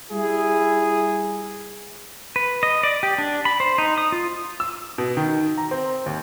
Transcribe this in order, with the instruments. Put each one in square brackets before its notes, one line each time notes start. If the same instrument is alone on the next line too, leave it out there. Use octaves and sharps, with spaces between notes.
[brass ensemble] G3 E4 G#4
[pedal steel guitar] B4
D#5
D5
G4
D4
B5
C5
D#4
D#6
F4
[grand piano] E6
B2
D#3
A#5
C4
D#2